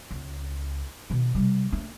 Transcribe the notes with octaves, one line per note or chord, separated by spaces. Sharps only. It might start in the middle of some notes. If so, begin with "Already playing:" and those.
C#2
B2 D#3
C3 G3
A3 D4